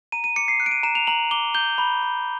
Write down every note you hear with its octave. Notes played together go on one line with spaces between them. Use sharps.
A#5 D#7
D#7
D6 C#7
C7
F#6 C#7
D7
D#7
A#5 E7
F7
A#5 F#7
D6 G7
G6 G7
B5
B5